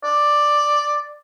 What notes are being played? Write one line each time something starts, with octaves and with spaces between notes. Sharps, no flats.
D5